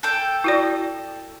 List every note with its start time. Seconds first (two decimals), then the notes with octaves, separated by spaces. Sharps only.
0.03 A4 G5
0.44 E4 F#4 D5